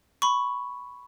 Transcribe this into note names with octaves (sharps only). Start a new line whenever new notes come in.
B5 C#6